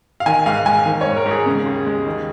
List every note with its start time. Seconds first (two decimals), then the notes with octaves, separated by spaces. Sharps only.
0.20 F5
0.26 D#3 G#5
0.46 G#2 F5
0.66 G#2 G#5
0.86 D#3
1.01 C#5
1.06 G#2
1.16 A#4
1.26 G#2
1.31 G#4
1.46 C#3
1.66 D#2
1.86 G#3
2.06 D#3